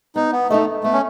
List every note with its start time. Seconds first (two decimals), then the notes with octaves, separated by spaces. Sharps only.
0.15 B3 D#4
0.32 B3
0.50 A3 D#4 A4 D#5
0.84 A3 B3
0.93 C#4